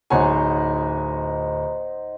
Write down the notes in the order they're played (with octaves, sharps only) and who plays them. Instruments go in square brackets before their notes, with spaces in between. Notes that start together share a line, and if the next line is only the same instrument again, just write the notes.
[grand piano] D1 C#5 G#5 [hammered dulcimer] D#4 C5 F#5 [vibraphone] A#5